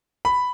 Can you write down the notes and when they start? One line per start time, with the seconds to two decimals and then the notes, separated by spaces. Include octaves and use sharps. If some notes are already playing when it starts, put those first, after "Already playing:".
0.25 B5